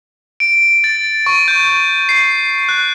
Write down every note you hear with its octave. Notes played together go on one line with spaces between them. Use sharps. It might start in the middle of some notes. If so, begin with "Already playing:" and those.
D7
A6
C#6
G6
C7
F#6